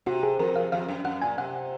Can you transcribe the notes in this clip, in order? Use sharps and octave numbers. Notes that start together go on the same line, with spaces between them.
C3 F#4
G#4
F2 A#4
F5
F2 F5
F#2
F#2 F#5
A#2 G#5
C3 F#5